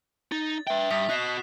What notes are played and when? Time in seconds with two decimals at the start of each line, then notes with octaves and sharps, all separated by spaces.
0.32 D#4 A6
0.67 B4 E5 G5
0.91 G2 D#6 B6
1.09 F#4 D#5 F#6 C7 E7